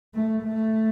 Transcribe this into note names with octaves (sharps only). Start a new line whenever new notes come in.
A3
A3